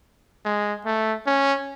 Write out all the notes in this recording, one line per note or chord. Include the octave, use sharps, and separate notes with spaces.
G#3
A3
C#4